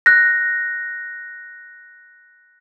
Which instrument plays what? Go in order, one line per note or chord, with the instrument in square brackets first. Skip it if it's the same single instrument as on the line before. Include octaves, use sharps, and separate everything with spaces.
[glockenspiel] F#6 A#6